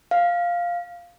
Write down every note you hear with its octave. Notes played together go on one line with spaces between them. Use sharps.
F5